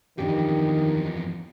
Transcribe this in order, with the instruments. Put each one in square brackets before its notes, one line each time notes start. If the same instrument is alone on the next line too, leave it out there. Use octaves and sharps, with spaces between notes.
[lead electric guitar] E2 F3 [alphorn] D#3 [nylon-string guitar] D4 G4